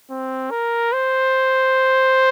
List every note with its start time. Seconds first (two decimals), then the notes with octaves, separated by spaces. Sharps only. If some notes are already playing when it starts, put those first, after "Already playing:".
0.10 C4
0.51 A#4
0.92 C5